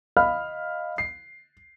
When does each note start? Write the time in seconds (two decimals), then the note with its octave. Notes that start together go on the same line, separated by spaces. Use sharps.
0.17 D#5 F5 B5 F6
0.98 C7